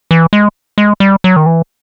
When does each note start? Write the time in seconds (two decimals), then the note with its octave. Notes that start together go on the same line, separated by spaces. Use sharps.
0.11 E3
0.33 G#3
0.78 G#3
1.00 G3
1.24 F#3
1.36 D#3
1.46 E3